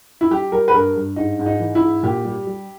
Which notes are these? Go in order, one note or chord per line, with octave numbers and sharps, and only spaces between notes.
E4
G3 G4
G3 A#4
B4
G2 A#4
G2
G#2 D#4
G#2
D#4
E3
E4
G#2
A#2 G4
G3
G3